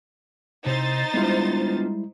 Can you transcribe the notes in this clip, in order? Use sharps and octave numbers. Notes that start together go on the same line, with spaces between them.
C3 D#4 E4 C5 A6
G3 G#3 B3 D4 E4 F4